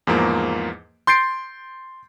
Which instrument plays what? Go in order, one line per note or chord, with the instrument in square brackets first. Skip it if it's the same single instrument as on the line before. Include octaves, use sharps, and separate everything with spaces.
[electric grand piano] E2 G#2 F3 A#3
C6 G6 A6 C7 D7